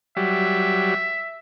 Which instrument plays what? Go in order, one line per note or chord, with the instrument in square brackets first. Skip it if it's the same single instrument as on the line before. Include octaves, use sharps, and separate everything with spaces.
[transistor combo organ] F#3 G3 [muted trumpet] E5